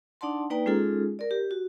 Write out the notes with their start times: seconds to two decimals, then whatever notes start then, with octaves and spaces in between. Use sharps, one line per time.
0.21 D4 D#4 D5 F#5 A5 C6
0.50 A#3 D#4 B4 D5 G5 A#5
0.66 G#3 C#4 D#4 F4 G#4 A4
1.19 A#4 D5
1.31 G4
1.51 F#4